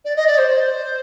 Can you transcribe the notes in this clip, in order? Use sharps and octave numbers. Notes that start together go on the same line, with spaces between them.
D5
D#5
D5
C5